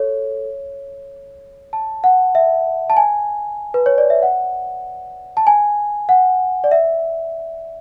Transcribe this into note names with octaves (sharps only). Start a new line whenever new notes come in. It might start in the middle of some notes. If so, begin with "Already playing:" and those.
Already playing: A4 C#5
A5
F#5
E5
A5
G#5
B4
C#5
D5
E5
F#5
A5
G#5
F#5
D5
E5